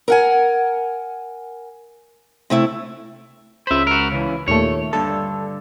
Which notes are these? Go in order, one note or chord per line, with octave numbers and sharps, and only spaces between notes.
A#4 F#5 G#5
C3 A3 E4
C#2 C5 E5 B5
F#4 A#4
C#3 E3
D#2 A#2 A3 C#5
G2 D3 A4